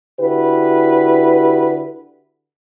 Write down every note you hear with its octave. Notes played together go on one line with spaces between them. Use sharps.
D3 E4 F#4 G4 B4